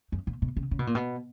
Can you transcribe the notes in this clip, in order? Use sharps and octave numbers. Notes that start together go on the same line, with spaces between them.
F#2
A#2
B2
C#3
C#3
B2
A#2
B2